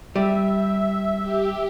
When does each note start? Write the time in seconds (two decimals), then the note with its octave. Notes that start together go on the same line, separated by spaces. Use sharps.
0.16 G3 E5
1.21 G4